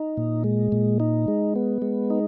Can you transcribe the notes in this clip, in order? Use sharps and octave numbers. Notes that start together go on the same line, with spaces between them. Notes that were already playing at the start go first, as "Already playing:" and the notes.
Already playing: D#4
A#2
G#3
A#2
D#4
G#3
B3
G#3
D#4